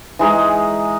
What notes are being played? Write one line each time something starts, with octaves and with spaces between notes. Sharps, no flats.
E3 G#3 D#4 G#4